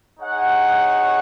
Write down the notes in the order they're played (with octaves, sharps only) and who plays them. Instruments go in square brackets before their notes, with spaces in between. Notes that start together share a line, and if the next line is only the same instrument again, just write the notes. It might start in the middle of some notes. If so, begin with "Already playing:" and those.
[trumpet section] D#4 G#4 C#5 F#5